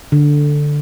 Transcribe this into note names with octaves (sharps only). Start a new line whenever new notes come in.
D3